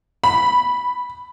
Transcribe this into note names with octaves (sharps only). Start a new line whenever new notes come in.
B5